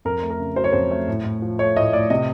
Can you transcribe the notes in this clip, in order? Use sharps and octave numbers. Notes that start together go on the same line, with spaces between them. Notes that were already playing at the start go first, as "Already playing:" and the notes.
F2 A#4
A3
A#4
C#3
F#3 C5
C#5
F2 C5
A3
A2
A2
F3
A3 C#5
A2 D#5
A2 D5
C3 D#5